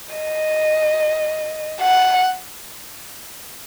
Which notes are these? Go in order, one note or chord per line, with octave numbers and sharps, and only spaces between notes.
D#5
F#5